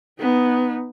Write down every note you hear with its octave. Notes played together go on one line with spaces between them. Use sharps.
B3 D#4